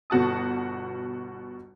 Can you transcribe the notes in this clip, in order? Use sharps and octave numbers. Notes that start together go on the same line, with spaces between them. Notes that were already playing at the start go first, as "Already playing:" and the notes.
G1 B2 F#4 A5 D#6